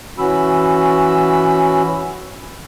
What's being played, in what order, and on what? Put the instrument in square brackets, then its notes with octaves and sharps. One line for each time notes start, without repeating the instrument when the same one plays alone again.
[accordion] E3 C#4 F#4 B5 E6